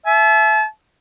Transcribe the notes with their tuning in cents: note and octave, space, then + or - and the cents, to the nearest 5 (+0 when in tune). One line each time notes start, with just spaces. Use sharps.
E5 +15 A5 -40